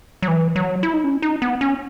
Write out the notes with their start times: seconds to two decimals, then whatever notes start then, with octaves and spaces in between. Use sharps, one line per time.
0.22 F#3
0.28 E3
0.56 F#3
0.83 E4
0.93 D#4
1.04 C#4
1.22 D#4
1.42 B3
1.61 C#4